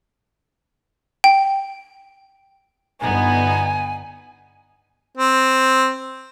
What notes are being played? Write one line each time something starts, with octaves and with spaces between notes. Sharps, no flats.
G5
G1 B3 D#4 G#5
C4